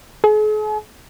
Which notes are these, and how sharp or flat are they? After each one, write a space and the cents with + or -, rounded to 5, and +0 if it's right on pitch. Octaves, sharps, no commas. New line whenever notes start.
G#4 +45